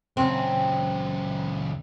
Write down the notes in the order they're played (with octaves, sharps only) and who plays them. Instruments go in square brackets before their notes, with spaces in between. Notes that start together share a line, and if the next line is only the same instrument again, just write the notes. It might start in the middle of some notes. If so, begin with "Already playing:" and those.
[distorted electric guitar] C#2 F#2 [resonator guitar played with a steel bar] C4